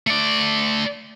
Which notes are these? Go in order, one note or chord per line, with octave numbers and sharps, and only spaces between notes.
A3 D5